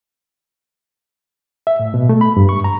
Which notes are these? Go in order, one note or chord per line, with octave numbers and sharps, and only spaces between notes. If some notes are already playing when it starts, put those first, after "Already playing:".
E5
A2
B2
A3
B5
G2
C#6
A#5